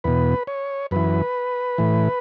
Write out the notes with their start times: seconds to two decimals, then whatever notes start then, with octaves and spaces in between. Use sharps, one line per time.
0.04 E2 B2 B4
0.47 C#5
0.91 F#2 E3 B4
1.78 A2 E3